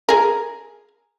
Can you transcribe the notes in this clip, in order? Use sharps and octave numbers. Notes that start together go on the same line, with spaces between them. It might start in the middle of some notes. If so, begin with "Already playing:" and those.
G#4 A#4